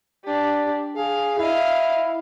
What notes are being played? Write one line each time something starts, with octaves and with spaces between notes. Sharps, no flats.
D4 G4
G#4 F5
E4 D#5 F5